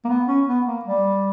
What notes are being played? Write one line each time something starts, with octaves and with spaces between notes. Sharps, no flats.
A#3
B3
C#4
B3
A#3
G3